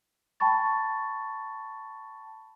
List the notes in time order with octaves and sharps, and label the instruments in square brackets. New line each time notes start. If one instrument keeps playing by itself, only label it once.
[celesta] G5 A5 B5 C#6 A6